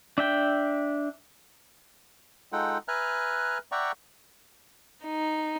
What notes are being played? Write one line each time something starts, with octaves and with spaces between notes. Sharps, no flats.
D4 E5 G5
G#3 D#4 F4 A4 F#5 G5
B4 E5 G#5 A#5 F6 F#6
D5 E5 F#5 G5 A#5 C#6
D#4